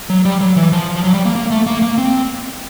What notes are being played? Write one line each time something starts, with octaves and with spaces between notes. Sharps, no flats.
F#3
G3
F#3
E3
F3
F3
F#3
G3
A#3
A#3
A3
A#3
A#3
C4